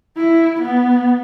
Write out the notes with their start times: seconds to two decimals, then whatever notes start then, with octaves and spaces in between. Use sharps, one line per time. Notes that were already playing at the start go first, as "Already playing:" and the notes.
0.17 E4
0.61 B3